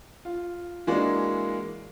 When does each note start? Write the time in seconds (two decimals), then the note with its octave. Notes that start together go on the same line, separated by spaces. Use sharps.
0.25 F4
0.87 E3 G#3 A#3 D4 F#4